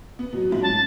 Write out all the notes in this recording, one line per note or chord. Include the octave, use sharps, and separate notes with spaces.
B3
B2 F#3
G#2 F3 F#3
C#4 A5